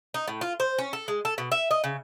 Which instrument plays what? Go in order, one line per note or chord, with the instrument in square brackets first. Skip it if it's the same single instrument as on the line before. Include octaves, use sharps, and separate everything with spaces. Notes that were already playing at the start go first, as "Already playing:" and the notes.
[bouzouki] D#4
A2
F4
C5
C#4
A4
G#3
A4
B2
E5
D#5
C#3